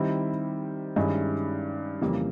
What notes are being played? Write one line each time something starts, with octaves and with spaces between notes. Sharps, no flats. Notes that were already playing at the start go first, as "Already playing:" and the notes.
Already playing: D#3 G3 C4 E4
G2 D#3 G#3 C#4 E4
F2 C#3 E3 G3 A#3